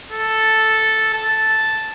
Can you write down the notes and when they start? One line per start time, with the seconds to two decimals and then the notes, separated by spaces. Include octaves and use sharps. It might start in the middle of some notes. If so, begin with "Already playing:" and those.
0.11 A4
1.13 A5